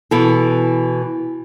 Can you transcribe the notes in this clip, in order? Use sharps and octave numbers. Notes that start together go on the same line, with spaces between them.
B2 E3 A4